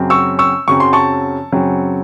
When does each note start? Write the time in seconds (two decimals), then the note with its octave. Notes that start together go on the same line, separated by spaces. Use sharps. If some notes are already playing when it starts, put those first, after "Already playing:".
Already playing: F#2 C#3 F#3 C4
0.10 C#6 E6
0.39 C#6 E6
0.68 F#2 C#3 F#3 C4 C#6
0.80 C6
0.93 A5 C#6
1.52 F#2 C#3 F#3 C4